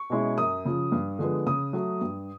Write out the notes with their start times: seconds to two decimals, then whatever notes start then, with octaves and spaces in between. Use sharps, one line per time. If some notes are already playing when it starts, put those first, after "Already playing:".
Already playing: C#6
0.10 B2 G#3 C#4 E4
0.38 F#2 D#6
0.65 C#3 F3
0.92 G2
1.19 D3 F3 G#3 B3
1.46 C#3 D#6
1.73 F#3 A3
2.01 G2